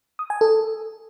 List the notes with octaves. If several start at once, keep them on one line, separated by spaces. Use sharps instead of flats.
D#6
G#5
A4